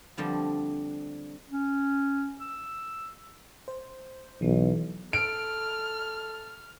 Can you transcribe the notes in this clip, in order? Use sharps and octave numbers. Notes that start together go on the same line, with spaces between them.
D3 F3 G3 B3 C4
C#4
E6
C5
B1 E3
A4 F6 D7